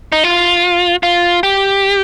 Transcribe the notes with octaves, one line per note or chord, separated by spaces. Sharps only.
D#4
F4
F4
G4